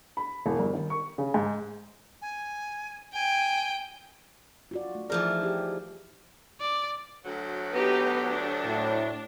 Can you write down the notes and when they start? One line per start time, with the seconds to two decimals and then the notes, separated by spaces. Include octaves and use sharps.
0.17 B5
0.46 E1
0.59 G1
0.74 D#3
0.90 C#6
1.18 C#3
1.34 G#2
2.21 G#5
3.14 G5 G#5
4.71 F4 F#4 D5
4.95 A3
5.10 E3 F3 D#4 G#4 A#4 D5
5.43 D#4 G4
6.61 D5
7.25 D2 F#3
7.72 B3 D#4 G4 B4
8.31 D4
8.65 A2